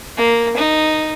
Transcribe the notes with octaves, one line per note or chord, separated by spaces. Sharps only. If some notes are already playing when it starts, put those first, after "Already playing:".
A#3
D#4